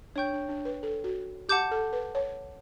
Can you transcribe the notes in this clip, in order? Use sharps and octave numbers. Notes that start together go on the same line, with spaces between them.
D4 C#5 G5 C#6 G6
D4
D4
B4
A4
F#4
G4 F#5 A5 D6 G6
A4
B4
C#5